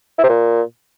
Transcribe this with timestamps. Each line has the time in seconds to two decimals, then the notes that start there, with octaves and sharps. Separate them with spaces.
0.19 E4
0.24 C3
0.29 A#2